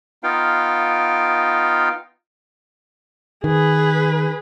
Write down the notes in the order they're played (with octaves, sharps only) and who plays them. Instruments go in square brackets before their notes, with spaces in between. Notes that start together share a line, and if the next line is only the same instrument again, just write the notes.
[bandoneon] B3 D#4 F4 F5 G5
[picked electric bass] D#3 [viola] G#4 B4